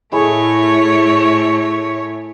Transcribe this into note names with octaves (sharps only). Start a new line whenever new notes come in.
A2 A3 E4 G#4 A4 C#5